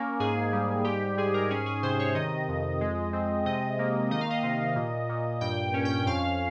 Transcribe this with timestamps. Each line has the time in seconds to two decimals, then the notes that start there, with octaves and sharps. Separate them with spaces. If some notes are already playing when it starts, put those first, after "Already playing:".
Already playing: A#3 C#4
0.20 G#2 G#4
0.52 G3
0.84 G#2 G4
1.17 G#2 G#4
1.34 A#4
1.50 C#4 G#4
1.66 G#4
1.83 C3 C5
1.99 C#5
2.15 D#3 D#5
2.48 F2
2.81 G#3
3.13 C4
3.46 C3 D#5
3.79 A#3
4.11 D#3 D#5
4.21 F5
4.30 D#5
4.43 C3
4.76 A#2
5.09 A#2
5.41 G2 G5
5.74 C#4
5.85 G5
6.06 F2 F5